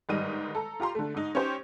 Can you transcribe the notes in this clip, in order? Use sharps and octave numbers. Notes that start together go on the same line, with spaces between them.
G1 G#2 D#3 G3 D#5 D#7
A4 A#5
F4 G4 A#5 C6
D3 A3
G#2 D#4
C#4 D#4 G4 C5